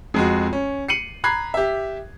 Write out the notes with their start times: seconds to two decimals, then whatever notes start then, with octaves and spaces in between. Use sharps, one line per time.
0.14 F2 G#3 F#4
0.53 C#4
0.88 C7 C#7 D#7 F#7
1.24 A#5 B5 F#6 G#6 C7
1.54 G4 E5